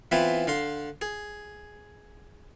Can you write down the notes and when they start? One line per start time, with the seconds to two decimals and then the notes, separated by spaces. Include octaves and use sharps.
0.11 E3 B3 C4 E4 F4
0.47 D3 F5 C6
1.01 G#4